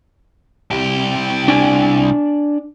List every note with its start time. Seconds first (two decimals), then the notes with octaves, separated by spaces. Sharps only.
0.71 C2 G4
1.48 D4 D5 G#5